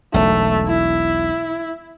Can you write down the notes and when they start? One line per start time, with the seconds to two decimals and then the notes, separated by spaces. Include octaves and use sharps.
0.14 E1 B1 A3
0.68 E4